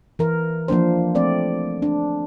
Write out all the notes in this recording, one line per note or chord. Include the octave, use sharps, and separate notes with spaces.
E3 A#4
F3 A#3 D4 C5
A3 C4 D5
D4